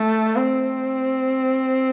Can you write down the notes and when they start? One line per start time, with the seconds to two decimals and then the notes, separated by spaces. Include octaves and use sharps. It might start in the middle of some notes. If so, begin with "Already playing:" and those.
Already playing: A3
0.36 C4